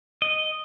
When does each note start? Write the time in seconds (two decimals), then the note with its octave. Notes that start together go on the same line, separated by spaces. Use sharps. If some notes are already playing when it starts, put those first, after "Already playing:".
0.22 D#5